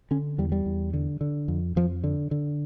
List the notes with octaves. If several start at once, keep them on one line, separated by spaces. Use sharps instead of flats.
D3 C#4
E2 G3
G3
E2
D3
D3
F2
F2 F3
D3
D3